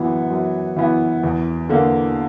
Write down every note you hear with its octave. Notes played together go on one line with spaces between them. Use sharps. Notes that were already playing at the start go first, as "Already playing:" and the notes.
Already playing: F#2 E3 B3
F#2
E3 B3
E2
D3 A#3